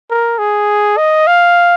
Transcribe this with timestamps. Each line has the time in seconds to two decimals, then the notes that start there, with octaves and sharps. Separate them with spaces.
0.10 A#4
0.39 G#4
0.97 D#5
1.27 F5